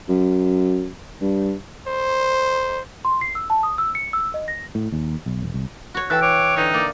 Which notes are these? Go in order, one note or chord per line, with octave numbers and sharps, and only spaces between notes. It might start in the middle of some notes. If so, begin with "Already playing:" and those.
F#2
G2
C5
C6
C7
E6
A5
D#6
E6
C#7
E6
D#5
A#6
A2
D#2
B1
E1
C2
F#4 C#5
E3 A4 G5 E6 F#6
C#5 D6
D3 E3 D#4
A#3 D5